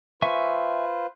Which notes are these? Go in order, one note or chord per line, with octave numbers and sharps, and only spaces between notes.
F4 B4 C5 E5 G#5 C#6